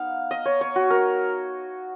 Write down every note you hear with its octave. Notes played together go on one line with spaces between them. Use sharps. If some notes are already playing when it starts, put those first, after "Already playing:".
Already playing: B3 D#4 F5
D#5
C#5
C#5
F#4
A#4